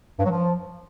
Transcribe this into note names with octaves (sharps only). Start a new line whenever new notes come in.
G2
F#3
F3